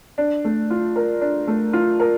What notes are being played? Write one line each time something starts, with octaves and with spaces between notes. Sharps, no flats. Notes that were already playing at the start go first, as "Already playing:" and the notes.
D4
A3
F4
A#4
D4
A3
F4
A#4